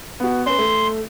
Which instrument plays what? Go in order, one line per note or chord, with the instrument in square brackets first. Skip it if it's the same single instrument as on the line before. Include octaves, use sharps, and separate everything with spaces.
[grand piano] B3 F#4
[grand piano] C#4 B4 [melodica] C6
[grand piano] A3